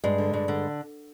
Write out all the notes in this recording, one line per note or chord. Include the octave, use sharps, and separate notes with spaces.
G2 G#3
D3
G2
D3